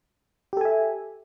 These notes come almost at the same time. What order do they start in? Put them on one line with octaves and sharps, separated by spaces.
G4 A4 G#5 E5